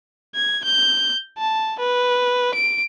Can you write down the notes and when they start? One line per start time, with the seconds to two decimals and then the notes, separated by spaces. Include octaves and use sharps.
0.35 G#6
0.65 G6
1.38 A5
1.79 B4
2.54 D7